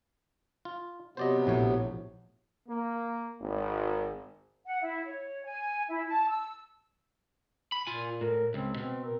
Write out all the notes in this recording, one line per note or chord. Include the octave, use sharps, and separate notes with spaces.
F4
C3 F#3 B3 C5 D5 D#5
A#1 A2 C#5
A#3
G#1
F#5
E4
C#5
G#5
E4
A5
E6
B5
A#2 F4 G#5
A2 A#4
C#2 C4
B2 C4
A#4